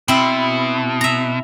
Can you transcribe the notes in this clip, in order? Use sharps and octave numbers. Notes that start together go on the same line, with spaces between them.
B2 C4 E4
E5 A#5